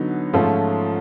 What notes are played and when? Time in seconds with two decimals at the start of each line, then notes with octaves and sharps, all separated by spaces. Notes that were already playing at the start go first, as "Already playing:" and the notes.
Already playing: D3 F#3 B3 D#4
0.33 G#2 F3 A3 C#4 F4